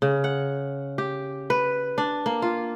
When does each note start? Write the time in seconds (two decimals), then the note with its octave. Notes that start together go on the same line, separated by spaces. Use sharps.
0.02 C#3
0.24 F#5
0.98 G4
1.50 B4
1.98 D4
2.26 A#3
2.42 F4